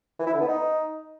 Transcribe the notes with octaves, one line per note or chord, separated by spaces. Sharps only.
E3
E4
D3
B3
D#4